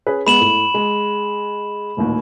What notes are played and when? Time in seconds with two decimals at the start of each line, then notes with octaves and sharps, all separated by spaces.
0.07 C#4 G#4 B4
0.27 G#3 B3 B5 E7 F#7
0.41 A2
0.74 G#3
1.97 D#1 A1 D#2